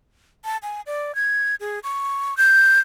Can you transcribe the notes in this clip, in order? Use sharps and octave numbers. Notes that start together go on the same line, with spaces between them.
A5
G#5
D5
G#6
G#4
C#6
G6